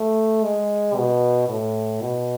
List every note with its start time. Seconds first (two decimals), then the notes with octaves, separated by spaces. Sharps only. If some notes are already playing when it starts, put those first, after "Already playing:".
Already playing: A3
0.43 G#3
0.96 B2
1.48 A2
2.01 B2